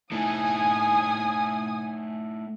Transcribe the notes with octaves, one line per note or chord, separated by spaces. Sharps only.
A3 D#4 E4 G#5 D#6